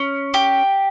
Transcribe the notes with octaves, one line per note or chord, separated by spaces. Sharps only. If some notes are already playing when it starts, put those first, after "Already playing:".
Already playing: C#4
G4